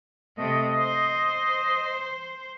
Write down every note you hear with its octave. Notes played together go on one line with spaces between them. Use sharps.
C3 A3 D#5
C5